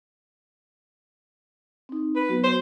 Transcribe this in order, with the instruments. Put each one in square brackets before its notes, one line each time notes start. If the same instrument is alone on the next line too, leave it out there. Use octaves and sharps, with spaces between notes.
[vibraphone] C4 D#4
[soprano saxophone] B4
[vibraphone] F#3 B3 F#4
[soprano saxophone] C5